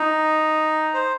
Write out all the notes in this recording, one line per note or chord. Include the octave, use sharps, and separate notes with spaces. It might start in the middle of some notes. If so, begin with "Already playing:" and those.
Already playing: D#4
C5